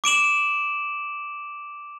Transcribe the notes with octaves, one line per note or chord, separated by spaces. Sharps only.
D6 D7 E7 F#7